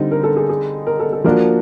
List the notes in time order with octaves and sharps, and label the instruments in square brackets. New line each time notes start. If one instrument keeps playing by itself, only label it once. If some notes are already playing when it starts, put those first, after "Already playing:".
Already playing: [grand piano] D3 G3 C4 D#4
[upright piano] A#4
A4
G#4
G#4
A#4
A4
A4
[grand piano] F3 A#3 D4 F#4 [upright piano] A#4